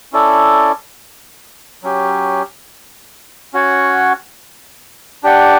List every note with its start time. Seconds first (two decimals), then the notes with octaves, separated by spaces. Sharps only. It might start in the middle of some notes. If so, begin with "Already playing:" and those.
0.13 C#4 E4 A4 D5
1.82 F#3 C#4 G4
3.53 C#4 F#4 C#5 F#5
5.23 D4 G4 D5 F#5